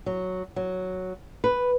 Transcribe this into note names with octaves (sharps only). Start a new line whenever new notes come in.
F#3
F#3
B4